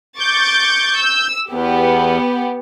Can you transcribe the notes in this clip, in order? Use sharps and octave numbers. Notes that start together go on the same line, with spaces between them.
C#6 D6 G6 A6
E6
E2 B3 G4